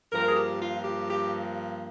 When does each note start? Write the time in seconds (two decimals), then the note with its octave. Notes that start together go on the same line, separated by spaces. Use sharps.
0.12 G2 F3 A#3 A#4
0.27 G#4
0.36 G4
0.60 F4
0.84 G4
1.07 G4